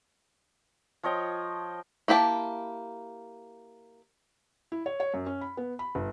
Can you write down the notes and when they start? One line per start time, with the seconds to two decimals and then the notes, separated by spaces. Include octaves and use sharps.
1.03 F3 C#5 D#5 G5
2.08 A#3 E4 G4 A5
4.72 E4
4.86 C#5
5.00 C#5
5.14 F#2
5.26 C#4
5.41 B5
5.57 B3
5.79 B5
5.95 G1